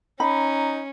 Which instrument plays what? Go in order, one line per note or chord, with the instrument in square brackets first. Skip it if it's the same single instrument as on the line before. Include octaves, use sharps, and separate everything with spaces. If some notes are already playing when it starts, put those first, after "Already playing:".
[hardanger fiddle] C#4 [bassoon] D#4 [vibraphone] A#5 [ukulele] B5